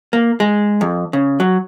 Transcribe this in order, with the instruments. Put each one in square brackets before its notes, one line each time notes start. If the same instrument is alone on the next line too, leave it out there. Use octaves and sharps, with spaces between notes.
[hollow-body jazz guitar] A#3
G#3
F2
C#3
F#3